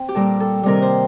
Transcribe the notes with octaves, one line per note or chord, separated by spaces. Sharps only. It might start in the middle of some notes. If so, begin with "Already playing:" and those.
Already playing: C4
G4
A#2 G3 A#3 A4
A4
C3 D#3 G3 C4 A#4
C5